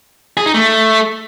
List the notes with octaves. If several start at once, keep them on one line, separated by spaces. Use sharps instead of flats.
G#4
D#4
A3